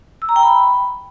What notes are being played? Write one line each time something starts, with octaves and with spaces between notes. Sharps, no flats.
E6
A#5
G5
B5